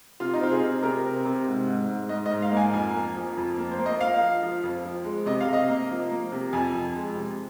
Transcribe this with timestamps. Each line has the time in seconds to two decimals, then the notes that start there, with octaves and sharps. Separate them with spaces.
0.20 C3 F4
0.33 D#4
0.41 C4 F4
0.51 G#4
0.62 C3
0.83 C3 A#4
1.05 C4
1.25 C3
1.47 G#2
1.68 G#2
1.88 G#2
2.09 G#2 D#5
2.26 D#5
2.31 G#2
2.42 F5
2.52 A#3 G#5
2.73 F2 G#5
2.94 A#3
3.16 F3
3.37 F2
3.58 A#3
3.71 C5
3.79 A#3
3.86 D#5
4.00 F3 F5
4.21 F3
4.43 F3
4.64 F2
4.85 F3
5.05 G#3
5.26 C3 D#5
5.40 F5
5.48 C3
5.53 D#5
5.69 A#3
5.90 F3
6.11 A#3
6.32 C3
6.53 F2 G#5
6.74 F2
6.96 G#3
7.16 C3